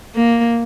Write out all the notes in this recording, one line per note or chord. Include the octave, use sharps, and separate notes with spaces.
A#3